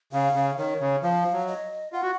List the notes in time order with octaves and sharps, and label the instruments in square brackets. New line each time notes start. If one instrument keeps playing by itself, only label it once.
[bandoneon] C#3 [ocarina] F5
[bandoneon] C#3
[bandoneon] D#3 [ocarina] C#5
[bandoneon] C#3
[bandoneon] F3 [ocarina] F5
[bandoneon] F#3
[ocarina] D#5
[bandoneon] F4 [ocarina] F#5
[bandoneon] F#4